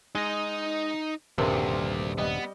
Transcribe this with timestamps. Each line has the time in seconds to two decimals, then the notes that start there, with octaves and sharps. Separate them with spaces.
0.15 G#3 D#4 D#5
1.38 D#1 D2 G2 C3 A#4 C6
2.18 G3 B3 G4 D#5